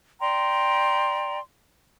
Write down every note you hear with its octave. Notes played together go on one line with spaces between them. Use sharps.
D5 G5 A#5 C6